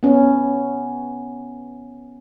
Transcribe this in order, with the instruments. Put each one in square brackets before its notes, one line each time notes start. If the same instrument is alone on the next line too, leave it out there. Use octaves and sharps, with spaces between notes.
[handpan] B3 C#4